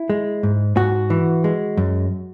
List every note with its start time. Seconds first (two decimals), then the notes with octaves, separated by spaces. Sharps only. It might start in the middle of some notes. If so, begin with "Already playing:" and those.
Already playing: E4
0.10 G#3
0.43 G#2
0.76 G#2 F#4
1.10 E3
1.44 G#3
1.77 F#2